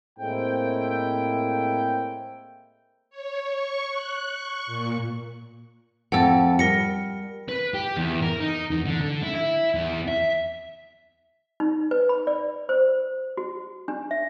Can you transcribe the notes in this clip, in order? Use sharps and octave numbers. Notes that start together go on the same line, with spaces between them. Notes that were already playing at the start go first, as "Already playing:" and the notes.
A2 G#3 A#3 C4 E4 G5
C#5
C#6
F#6
C#6
A#2
F2 F#5 G5 A5 E6
G3 A#4 A#6 C#7
B4
G4
E2
A#4
D#4
E2
D3
D3
E4
E4
E2
E5
D#4
B4
B5
D5
C5
F#4
D4
E5